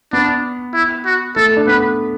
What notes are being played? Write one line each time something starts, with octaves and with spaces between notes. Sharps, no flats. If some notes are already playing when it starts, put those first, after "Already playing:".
B3 D4
E4
F#4
A3 A4
D4
B3 B4